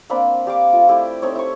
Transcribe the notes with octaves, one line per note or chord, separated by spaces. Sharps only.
A#3 C4 D4 B5
D4 G4 F5 D6
A3 F4
A3 E4 G4 D5
A3 C4 D#4 C#5
E4 C#6